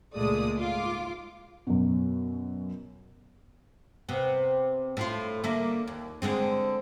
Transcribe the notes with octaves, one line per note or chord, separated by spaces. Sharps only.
C#2 A#2 G#3 A3 D5 D#6
G#2 F4 D6
F#2 B2
C3 B3
A2 F4
D3 A#3 E5
D#2
D3 G#3 C4